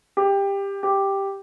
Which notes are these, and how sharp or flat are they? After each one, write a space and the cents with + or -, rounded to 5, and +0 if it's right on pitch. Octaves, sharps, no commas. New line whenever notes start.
G4 +15
G4 +0